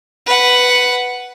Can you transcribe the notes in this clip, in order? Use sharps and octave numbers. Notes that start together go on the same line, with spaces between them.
B4 F#5